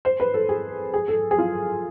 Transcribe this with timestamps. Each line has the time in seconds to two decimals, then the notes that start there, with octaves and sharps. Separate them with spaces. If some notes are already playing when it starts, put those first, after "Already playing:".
0.05 C5
0.20 B4
0.34 A4
0.49 G#4
0.94 G#4
1.08 A4
1.31 G#4
1.38 F4